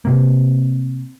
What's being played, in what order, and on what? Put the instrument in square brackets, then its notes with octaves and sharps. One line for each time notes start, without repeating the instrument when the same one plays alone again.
[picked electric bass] C3 A#3